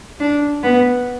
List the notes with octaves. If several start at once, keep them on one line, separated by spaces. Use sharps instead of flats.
D4
B3